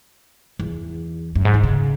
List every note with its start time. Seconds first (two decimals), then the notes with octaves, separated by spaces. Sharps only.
0.59 E2
1.35 F#2
1.45 G#2
1.54 D#3
1.64 C#3